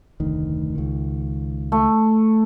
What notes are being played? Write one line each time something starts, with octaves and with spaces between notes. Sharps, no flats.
F1 D2 D#3
C#2 D#3
A3